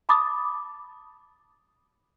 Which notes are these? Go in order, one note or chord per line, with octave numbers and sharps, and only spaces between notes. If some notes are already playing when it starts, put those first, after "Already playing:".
A5 B5 D6 D#6 A6